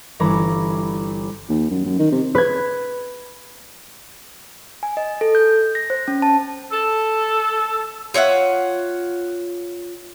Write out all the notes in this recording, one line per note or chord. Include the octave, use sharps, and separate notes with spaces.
G1 E3 C#4 A#5 B5 D6
D#2
F#2
F#2
D#3
C3
B4 G#6
G#5
D#5
A4
G6
A#6
C5
C#4
A5
A4
F4 C#5 E5 F#5